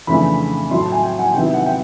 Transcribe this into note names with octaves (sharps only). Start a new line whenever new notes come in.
F2 C#3 E3 A3 D4 B5
A2 F#3 A3 C6
A5
G#5
G5
F#5
C3 D#3 F#3 B3 E4 G5
F#5
G5